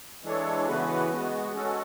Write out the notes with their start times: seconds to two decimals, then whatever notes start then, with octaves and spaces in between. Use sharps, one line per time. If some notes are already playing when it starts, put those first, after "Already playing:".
0.23 E3 G#3 D4 A4 C#5
0.67 C#3 E3 B3 F#4 B4
1.10 G#3 B3 F#4
1.53 G#3 C#4 F#4 A4